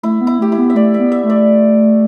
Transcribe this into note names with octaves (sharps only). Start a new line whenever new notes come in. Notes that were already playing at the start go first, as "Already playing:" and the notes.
A3 E4
B3
E4
A3 G4
E4
B3
E5
A3 D5
E5
B3
E5
A3
D5